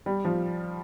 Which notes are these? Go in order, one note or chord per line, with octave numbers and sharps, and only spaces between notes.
G3
F3